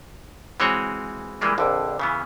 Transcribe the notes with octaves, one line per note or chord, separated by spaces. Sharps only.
E3 G#3 C4 F#4 C#5
E3 G3 G#3 A#3 D4
A#1 F2 D3
C#3 E3 B3